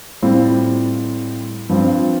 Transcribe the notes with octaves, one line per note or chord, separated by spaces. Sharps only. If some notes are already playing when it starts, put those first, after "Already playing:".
A2 G3 C4 F4
G2 F3 C4 F4